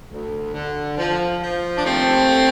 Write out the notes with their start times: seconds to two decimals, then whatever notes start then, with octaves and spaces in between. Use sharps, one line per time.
0.10 D2
0.54 D3
0.98 F3
1.41 F3
1.77 D4
1.85 D#2 A3 C4
2.29 D3